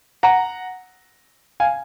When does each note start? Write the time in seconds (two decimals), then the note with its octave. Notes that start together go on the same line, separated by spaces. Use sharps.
0.23 F#5 A#5
1.60 F5 G#5